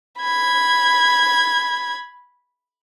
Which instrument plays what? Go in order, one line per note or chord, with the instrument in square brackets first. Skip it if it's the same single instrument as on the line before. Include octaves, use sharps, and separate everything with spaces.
[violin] B5 G#6